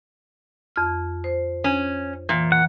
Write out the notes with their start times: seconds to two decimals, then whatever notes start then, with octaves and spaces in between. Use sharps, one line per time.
0.76 F2 F6
1.24 C5
1.64 C#4
2.29 A#2 E3
2.52 F#5